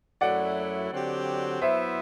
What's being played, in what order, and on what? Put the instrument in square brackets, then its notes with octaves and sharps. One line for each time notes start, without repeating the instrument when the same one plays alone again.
[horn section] F#2 F#3 A3 E4 [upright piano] D5 F#5
[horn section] D3 F#3 C4 G4
[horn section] F#3 B3 E4 [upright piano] C5 E5